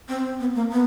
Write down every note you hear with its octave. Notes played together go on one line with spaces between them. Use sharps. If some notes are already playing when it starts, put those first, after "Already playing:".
C4
B3
A#3
B3